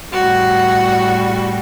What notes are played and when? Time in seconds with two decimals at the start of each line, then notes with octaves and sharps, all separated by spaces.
0.12 A2 G3 F#4